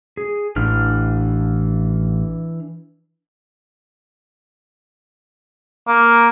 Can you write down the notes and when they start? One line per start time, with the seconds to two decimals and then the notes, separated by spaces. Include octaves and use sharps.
0.17 G#4
0.56 A1 E3 D4 F6
5.88 A#3